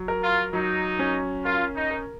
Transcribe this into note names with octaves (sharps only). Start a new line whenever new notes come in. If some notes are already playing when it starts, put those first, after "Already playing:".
Already playing: F#3
A#4
F4
F#3 D#4
C#4
F4 A#4
D#4
A#4